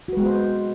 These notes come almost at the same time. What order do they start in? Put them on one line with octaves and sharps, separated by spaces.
F#4 B4 G#3 B3 C5